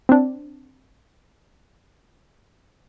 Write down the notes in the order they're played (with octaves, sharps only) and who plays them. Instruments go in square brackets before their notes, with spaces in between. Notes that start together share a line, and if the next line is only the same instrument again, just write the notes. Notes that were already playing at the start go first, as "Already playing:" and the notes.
[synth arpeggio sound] C4 D4